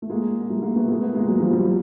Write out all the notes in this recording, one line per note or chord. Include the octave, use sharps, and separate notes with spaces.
A3
G#3 A#3
A#3
G3 A3
G#3 A#3
A3 B3
G#3 A#3
A3 B3
G#3 A#3
F#3 G#3
F3 G3
F3 G3
F#3